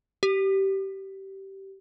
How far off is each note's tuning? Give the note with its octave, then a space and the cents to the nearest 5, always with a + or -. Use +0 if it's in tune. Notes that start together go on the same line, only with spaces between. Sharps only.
G4 -20